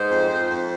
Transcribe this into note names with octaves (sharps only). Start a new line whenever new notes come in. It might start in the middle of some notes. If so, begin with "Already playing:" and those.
Already playing: G#2 C5
F2
F2
F2